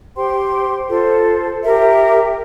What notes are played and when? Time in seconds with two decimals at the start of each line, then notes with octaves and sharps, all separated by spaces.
0.15 G4 C5 G5 C6
0.89 F4 A4 C5
1.62 G4 A#4 E5